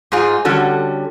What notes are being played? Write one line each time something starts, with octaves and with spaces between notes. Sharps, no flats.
G#2 D#4 F4 G#4
D3 G3 C#4 F#4 A4